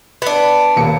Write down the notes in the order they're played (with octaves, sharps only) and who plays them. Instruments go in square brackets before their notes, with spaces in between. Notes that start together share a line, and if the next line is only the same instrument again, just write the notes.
[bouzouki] B3 D4
[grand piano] D#1 A#3 C#7